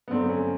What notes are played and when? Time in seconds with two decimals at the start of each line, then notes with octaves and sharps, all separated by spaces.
0.08 B3
0.11 G2 D3 F#3 A3 C4
0.29 C#4